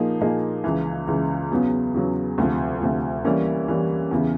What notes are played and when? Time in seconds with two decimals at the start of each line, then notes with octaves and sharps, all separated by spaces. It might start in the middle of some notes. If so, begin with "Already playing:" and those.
Already playing: A#2 F3 A#3 D#4 G#4
0.20 A#2 F3 A#3 D#4 G#4
0.64 C#2 C#3 E3
1.07 C#2 C#3 E3
1.51 E2 C#3 F#3 B3
1.94 E2 C#3 F#3 B3
2.38 D2 C3 F3
2.81 D2 C3 F3
3.24 E3 G3 A#3 C#4 E4
3.68 E3 G3 A#3 C#4 E4
4.11 E2 C#3 E3